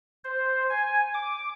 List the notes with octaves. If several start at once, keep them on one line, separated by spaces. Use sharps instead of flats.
C5
G#5
D6